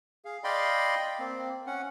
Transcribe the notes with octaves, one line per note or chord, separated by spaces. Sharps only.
G#4 F5
D5 D#5 F5 G5 B5 C6
A#3 C4
C#4 F#5